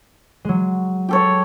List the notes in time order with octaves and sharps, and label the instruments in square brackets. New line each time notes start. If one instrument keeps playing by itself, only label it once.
[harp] F#3 G#3
[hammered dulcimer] G4 A4 C#5